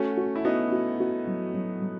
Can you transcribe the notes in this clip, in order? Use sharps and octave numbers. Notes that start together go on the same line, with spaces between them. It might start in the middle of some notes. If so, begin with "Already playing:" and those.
Already playing: A3 C#4 F#4
F#4
E4
B3 D#4 F#4
F#4
F#4
F#3
F#3
F#3